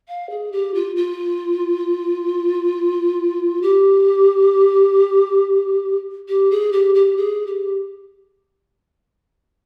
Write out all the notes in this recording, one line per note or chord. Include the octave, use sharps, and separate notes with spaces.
F5
G#4
G4
F4
F4
G4
G4
G#4
G4
G4
G#4
G4